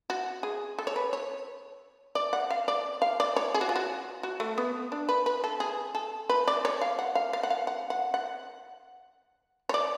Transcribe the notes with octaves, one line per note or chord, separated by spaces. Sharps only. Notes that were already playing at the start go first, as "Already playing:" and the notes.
F#4
G#4
A4
C#5
B4
C#5
D5
F#5
F5
D5
F5
D5
C#5
G#4
F#4
F4
F#4
F#4
A3
B3
D4
B4
B4
A4
G#4
A4
B4
D5
C#5
F5
F#5
F5
F5
F#5
F5
F#5
F#5
F#5
C#5
D5